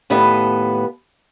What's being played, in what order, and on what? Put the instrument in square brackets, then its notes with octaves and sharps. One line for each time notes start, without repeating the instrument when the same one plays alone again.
[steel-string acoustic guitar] D#2 A2 B3 A4 B4 D#5